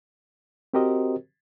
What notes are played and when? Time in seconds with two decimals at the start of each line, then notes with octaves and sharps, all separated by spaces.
0.74 C4 F#4 G4 A#4 C5 D#5